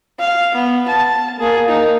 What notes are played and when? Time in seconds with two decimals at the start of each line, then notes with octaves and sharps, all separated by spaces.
0.19 F5
0.55 B3
0.88 A5
1.40 A#3 G#4
1.69 D#4